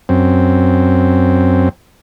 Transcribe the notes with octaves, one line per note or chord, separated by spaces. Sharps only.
F#2 C4